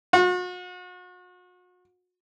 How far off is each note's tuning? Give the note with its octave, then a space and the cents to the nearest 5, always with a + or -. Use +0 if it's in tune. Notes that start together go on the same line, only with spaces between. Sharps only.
F#4 -40